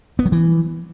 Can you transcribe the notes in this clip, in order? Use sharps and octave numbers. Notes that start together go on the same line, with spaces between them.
B3
F#3
E3